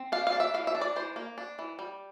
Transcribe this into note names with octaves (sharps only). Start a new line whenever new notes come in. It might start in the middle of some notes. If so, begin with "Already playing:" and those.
Already playing: C4
D4 F5
F5
D4
E5
E3 F5
E5
D4
D5
E3 C5
A#3
D4
E3
G3